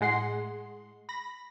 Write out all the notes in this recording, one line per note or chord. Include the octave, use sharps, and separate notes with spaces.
A2 G#3 F#5 C6 C7
B5 A#6